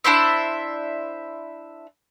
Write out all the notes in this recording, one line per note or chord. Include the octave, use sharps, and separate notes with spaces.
D4 E4 C5 E5